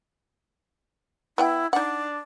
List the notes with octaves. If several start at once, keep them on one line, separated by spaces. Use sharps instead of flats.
B3 E4 F#5 G5
D4 D#4 F#5